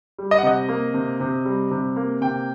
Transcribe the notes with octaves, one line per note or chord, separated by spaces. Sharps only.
G3
D#5
F#5
C3 D#5
A#3
C3
C3
G3
C3
A#3
C3 G5